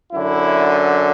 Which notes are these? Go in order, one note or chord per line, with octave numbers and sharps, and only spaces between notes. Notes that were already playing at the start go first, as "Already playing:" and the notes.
F#2 D3 E4